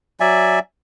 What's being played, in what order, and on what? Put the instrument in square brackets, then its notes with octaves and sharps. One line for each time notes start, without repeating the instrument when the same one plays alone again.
[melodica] F#3 D5 E5 G#5